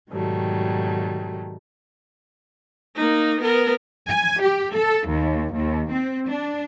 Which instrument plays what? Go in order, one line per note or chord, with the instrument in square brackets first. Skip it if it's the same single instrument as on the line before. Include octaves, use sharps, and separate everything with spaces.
[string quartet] G#2 B2 D#3 F#3 G3 A3
[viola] A#3 D#4
B3 A#4
[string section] G#5
G4
A4
D#2
D#2
C4
D4